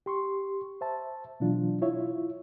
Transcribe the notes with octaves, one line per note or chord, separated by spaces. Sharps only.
G4 C6 C#6
C5 E5 A5
B2 E3 F#3 D4 F4
E4 F4 C#5 E5